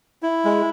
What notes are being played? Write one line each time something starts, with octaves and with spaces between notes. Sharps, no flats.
E4
G#3